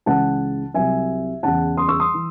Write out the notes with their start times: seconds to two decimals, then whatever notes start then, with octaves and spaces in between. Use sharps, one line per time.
0.06 C#2 C#3 E3 F#5 A5
0.74 C2 C3 F#3 E5 G#5
1.43 E2 C#3 E3 F#5 A5
1.77 C6 D#6
1.88 C#6 E6
2.00 C6 D#6
2.14 E3